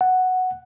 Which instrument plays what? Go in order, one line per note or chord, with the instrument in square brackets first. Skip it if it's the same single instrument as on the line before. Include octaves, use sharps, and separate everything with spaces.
[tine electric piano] F#5